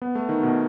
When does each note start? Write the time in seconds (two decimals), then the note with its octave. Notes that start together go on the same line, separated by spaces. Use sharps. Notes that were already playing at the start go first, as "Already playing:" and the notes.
0.02 B3
0.15 A3
0.29 D#3
0.43 B2